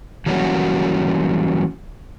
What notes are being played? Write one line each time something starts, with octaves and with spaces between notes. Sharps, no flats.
E3 F#3 G3 A#3 C#4 F#4